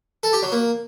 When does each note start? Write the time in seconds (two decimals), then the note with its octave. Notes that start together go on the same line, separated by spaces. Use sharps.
0.23 A4
0.33 G4
0.42 F#3
0.52 A#3